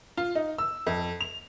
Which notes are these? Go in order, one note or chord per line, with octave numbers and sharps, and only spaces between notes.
F4
D#4
E6
F2
F7